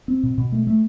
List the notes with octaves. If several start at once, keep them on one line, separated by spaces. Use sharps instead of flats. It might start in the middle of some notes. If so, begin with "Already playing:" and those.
C4
B2
B2
A3
A3